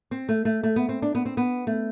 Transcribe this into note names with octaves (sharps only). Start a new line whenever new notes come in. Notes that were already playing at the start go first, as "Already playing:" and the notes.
C4
A3
A3
A3
B3
C4
D4
B3
C4
B3
A3